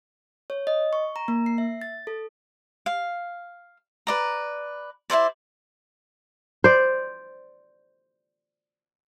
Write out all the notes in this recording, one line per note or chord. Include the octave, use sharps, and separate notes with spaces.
C#5
D#5
C#6
A#5
A#3
C7
E5
A6
A4
F5
B4 D5 A#5
E4 F4 C5 D5
C5 D5